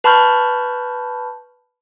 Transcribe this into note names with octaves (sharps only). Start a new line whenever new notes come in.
B4 A5 B5 C#6 F6 G6